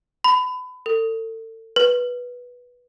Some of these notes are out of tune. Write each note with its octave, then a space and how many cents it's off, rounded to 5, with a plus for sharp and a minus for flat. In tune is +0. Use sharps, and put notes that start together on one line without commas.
B5 +30
A4 +35
B4 -10